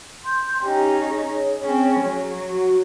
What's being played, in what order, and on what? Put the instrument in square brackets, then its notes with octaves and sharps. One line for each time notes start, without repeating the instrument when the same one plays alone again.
[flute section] C6 G6
[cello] C#4 D#4 [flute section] G4 G5
[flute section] G#4 C#5
[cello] C4 C#4
F#3
[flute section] F#4